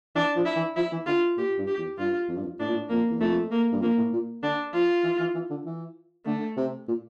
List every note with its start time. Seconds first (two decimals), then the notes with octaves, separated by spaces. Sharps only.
0.15 E3 D4
0.35 F3
0.46 E4
0.56 E3
0.76 F3 E4
0.92 E3
1.07 D3 F4
1.37 A#2 G4
1.58 G2
1.67 G4
1.78 E2
1.98 G2 F4
2.29 F2
2.37 G2
2.43 F2
2.60 A2 D4
2.68 A#2
2.75 A2
2.90 F2 A#3
3.10 E2
3.21 F2 A3
3.51 A#3
3.72 G2
3.82 F2 A#3
3.97 A2
4.13 A#2
4.43 D3 D4
4.74 F3 F4
5.04 E3
5.19 E3
5.34 E3
5.50 D3
5.66 E3
6.26 D3 A3
6.57 C3
6.88 A#2